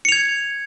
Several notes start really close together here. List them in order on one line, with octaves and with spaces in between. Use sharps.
C#7 F7 G#6